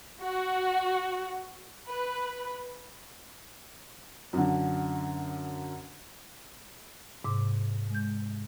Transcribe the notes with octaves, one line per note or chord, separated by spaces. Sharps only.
F#4
B4
F#2 D3
G#2 C3 D6
G#3 G6